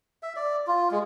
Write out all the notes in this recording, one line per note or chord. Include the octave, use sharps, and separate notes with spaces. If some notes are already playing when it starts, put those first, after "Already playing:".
E5
D5
F4
G#3